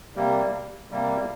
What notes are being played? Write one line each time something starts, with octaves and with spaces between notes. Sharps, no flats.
C3 G3 A#3
C3 G3 A#3